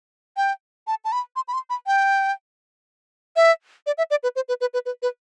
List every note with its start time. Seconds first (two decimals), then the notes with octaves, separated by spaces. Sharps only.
0.37 G5
0.87 A5
1.05 A5
1.12 B5
1.36 C6
1.48 B5
1.53 C6
1.70 B5
1.87 G5
3.36 E5
3.86 D5
3.98 E5
4.11 D5
4.23 B4
4.36 C5
4.49 B4
4.61 B4
4.74 B4
4.86 B4
5.02 B4